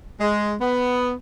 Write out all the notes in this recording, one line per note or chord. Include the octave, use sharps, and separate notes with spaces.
G#3
B3